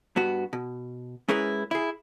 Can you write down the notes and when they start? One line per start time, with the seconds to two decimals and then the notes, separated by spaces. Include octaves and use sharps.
0.16 G2 B3 F#4
0.53 B2
1.28 G#3 C#4 E4 G#4 A#4 B4
1.71 E4 G#4